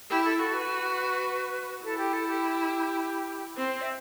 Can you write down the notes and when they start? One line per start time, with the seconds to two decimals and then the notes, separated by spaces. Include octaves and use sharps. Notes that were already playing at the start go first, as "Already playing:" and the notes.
0.10 E4 G4
0.25 A4
0.38 F#4 A4
0.54 B4
1.84 E4 A4
1.98 G4
2.13 A4
2.27 G4
3.57 C4 C5
3.81 E5